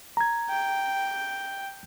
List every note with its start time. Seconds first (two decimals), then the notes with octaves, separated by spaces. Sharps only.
0.17 A#5 G#6
0.49 G5